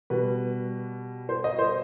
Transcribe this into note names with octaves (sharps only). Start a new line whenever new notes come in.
B2 G3 B4
C5
D#5
C5